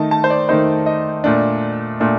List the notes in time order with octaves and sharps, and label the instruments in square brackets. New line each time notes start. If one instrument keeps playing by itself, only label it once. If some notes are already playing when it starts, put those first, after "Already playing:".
Already playing: [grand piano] D#3 A3 D#4 A5
A5
C5
D5
D#3 A3 D#4 C5
D#5
A#2 A3 D4
A#2 A3 D4